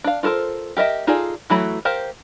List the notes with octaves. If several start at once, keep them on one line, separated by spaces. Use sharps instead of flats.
D4 F5
F4 F#4 A4 A#4 C5
G4 A#4 D#5 E5
D#4 F4 G#4 A4 D5
E3 F#3 A3 B5
G4 A#4 C5 F5